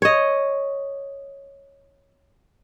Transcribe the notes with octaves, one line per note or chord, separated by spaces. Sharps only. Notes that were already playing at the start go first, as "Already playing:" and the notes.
C#5 D#5